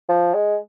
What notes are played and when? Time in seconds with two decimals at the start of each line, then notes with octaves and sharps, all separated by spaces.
0.09 F3
0.34 G#3